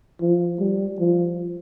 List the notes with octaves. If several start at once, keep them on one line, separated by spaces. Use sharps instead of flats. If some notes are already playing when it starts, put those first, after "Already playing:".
F3
G3
F3